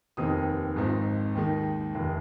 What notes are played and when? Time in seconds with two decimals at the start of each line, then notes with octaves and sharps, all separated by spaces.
0.17 F1 D#2 D#3 C4 D#4 D#6
0.76 G#1 G#2 F3 C4 D#4
1.35 D#2 D#3 G#3 D#4
1.95 F1 D#2 D#3 A#3